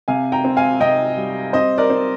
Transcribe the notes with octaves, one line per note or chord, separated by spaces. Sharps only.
C3 F5 G#5
G5 A#5
C4
F5 G#5
C3 D#5 G5
G3
C4 C5 D#5
A#4 D5
C4